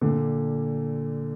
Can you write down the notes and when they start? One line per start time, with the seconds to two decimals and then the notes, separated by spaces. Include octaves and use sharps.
0.01 A#2 D3